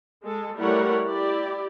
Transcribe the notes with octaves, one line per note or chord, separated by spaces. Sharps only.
G#3 A4
G3 A3 E4 A#4 C#5 F#5
E4 G4 D5